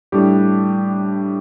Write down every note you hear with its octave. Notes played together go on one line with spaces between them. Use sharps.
A2 G3 D4 G4